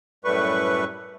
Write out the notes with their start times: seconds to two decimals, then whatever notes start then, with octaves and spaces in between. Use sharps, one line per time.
0.25 F#2 A2 G3 A3 B4 C#6